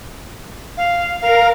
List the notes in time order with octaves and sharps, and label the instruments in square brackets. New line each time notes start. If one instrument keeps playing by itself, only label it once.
[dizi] F5
[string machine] A#4 [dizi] F5